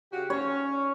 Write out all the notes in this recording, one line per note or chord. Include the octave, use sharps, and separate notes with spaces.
C#3 F#4 G4
C#4 C#5